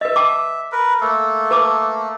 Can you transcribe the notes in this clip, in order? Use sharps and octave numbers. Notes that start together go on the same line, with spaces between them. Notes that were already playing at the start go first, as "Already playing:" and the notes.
B4 D#5 E5
G5 A5 D6
A#4 B4
A3 A#3 A4
B4 A5 D6